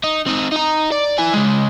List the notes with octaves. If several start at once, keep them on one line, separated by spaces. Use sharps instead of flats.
D#4
C4 D#4
D#4 A#5
D5
E4 G#5
C#3 G#3